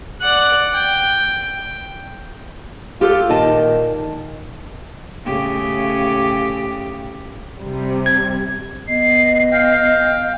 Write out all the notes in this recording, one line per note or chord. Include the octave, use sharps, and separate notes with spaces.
D5 F#5
G5
F4 G4 A4
A#2 D#3 D#5 A5
A2 C#3 G4
C3 G3
G#6
B3 D#5 C7
F5 G5